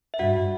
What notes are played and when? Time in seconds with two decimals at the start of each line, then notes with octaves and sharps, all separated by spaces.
0.14 E5
0.19 G2 F#4 F#5